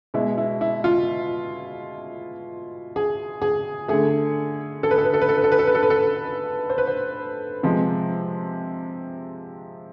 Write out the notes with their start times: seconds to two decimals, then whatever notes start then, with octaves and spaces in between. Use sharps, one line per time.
0.14 B2 G#3 E4
0.38 E4
0.61 E4
0.84 F4
2.96 G#4
3.42 G#4
3.88 D3 A3 G#4
4.83 A4
4.91 B4
4.98 A4
5.05 B4
5.14 A4
5.22 B4
5.29 A4
5.37 B4
5.44 A4
5.52 B4
5.59 A4
5.67 B4
5.75 A4
5.83 B4
5.90 A4
6.69 C5
6.78 B4
6.87 C5
7.63 C3 F3 G#3